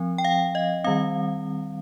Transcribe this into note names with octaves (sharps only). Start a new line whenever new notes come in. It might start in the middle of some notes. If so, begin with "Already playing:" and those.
Already playing: F3 C4
G5
F5
D#5
D#3 G3 C4 F5